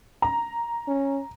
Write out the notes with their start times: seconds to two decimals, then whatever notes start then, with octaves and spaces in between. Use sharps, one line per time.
0.22 A#5
0.88 C#4